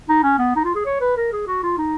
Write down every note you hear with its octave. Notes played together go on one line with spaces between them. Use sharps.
D#4
C#4
B3
D#4
F4
G#4
C#5
B4
A#4
G#4
F#4
F4
D#4